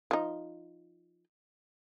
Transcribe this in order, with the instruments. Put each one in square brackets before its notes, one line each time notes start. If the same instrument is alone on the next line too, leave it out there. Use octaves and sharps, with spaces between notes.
[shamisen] F3 D#4